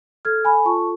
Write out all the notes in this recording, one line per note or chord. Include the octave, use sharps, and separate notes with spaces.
A4 F6 G#6
G#5 B5
F4 A5 C#6